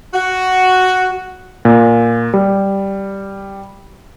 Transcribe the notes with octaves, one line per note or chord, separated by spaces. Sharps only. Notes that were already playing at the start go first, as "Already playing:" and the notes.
F#4
A#2
G3